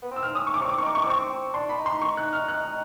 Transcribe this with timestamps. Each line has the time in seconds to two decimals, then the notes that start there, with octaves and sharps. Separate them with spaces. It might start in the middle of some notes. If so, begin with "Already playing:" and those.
0.02 B3
0.11 C4
0.16 E6
0.23 F6
0.34 C#4 D#6
0.47 C#6
0.54 D6
0.59 C4 C#6
0.70 D6
0.78 C#6
0.82 D#4 D6
0.95 C#6
1.02 D6
1.06 C4 C#6
1.30 C4
1.54 D4 C6
1.69 B5
1.78 D#4
1.86 C6
2.02 C#6
2.17 F#6
2.33 F6
2.48 F#6